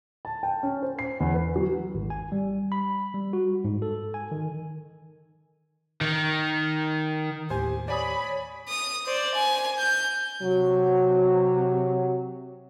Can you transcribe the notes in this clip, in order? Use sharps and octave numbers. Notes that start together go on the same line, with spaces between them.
A5
G5
C#4
C5
C7
E2
B4
F#3
G#1
G#5
G3
B5
G3
F#4
G#2
A4
G#5
D#3
D#3
D#2 A2 G4 C5 G#5
C#5 D5 G#5 B5 D#6
D#6
C5 D5
G#5
G6
C3 F#3